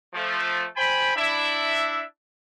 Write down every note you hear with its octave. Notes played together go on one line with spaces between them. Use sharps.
F3 A3
C5 G5 G#5 B5
D4 E4 E5